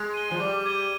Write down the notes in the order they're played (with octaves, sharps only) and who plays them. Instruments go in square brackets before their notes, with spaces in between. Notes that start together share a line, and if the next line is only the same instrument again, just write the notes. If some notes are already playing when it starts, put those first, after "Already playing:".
Already playing: [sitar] G#3
[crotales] D#7 G7
[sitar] F3
[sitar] G3 [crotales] D6
[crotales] G#6 D#7 G7